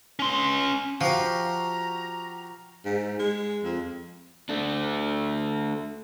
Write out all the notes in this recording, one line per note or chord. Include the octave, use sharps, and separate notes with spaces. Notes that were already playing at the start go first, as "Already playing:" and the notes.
C#4 C6
F3 F#4 G4 F5 A#5
G#2
G#3
F2
A3 D4